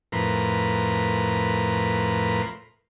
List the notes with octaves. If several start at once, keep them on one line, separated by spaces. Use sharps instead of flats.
F2 A2 A#4 B4 C6